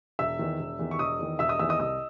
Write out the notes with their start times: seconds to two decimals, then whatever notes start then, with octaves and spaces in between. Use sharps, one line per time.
0.19 E1 E5 E6
0.39 E2 D#3
0.60 E1
0.79 E2 D#3
0.91 C#6
0.99 E1 D#5 D#6
1.19 E2 D#3
1.39 E1 E5 E6
1.49 D#5 D#6
1.59 E2 D#3 E5 E6
1.69 D#5 D#6
1.79 C2 D#5 D#6